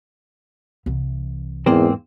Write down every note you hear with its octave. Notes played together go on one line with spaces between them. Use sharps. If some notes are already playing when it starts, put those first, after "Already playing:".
C2 E3
E2 G#2 A#3 C4